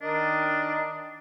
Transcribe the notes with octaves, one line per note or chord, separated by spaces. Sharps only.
D#3 D4 A#4 D#5